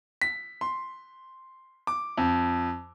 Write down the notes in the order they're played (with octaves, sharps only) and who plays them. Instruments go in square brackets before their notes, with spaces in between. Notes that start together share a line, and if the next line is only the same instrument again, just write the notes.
[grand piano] B6
C6
D6
F2